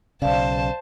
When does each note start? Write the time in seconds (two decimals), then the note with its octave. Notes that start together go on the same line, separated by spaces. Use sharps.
0.22 B1 C#3 C5 D5 F5 A5